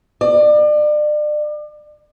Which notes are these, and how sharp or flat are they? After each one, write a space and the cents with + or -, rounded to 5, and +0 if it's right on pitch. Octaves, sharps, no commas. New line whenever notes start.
D5 +35